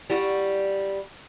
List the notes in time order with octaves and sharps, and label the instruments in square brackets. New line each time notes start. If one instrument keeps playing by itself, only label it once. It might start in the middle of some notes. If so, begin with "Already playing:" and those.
[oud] G3 F#4